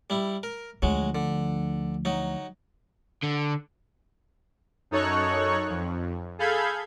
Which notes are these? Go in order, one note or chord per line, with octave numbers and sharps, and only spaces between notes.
G3 E4
A#4
D2 F3 F#3 G#3
D3
F#3 D#4
D3
F#2 D#4 A4 C#5 C#6 F#6
F2
G#4 A4 F5 B5 G6 G#6